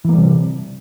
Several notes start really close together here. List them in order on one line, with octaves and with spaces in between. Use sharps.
E3 A#3 G3 C3